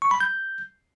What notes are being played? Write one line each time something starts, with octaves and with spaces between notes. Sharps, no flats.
C#6
B5
G6